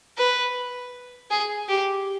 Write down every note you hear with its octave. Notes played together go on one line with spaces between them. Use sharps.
B4
G#4
G4